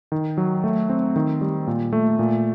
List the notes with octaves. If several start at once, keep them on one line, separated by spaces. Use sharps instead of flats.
D#3
F#3
A3
C4
D#3
G3
A#2
A3
A#2